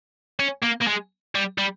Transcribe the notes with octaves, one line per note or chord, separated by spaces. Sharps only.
C#4
A#3
A#3
G#3
G3
G3